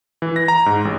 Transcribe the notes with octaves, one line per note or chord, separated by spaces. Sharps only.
E3
A#6
A#5
G#2
A1